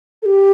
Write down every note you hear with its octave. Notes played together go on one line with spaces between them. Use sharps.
A4
G4